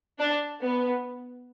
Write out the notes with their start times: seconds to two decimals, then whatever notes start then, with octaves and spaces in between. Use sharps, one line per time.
0.19 D4
0.62 B3